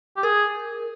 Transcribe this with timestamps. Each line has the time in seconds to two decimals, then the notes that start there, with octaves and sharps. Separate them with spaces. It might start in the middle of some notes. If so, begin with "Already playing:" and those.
0.17 G4
0.23 G#4 A#4